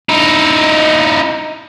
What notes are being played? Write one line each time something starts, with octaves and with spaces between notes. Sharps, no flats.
D#4 E4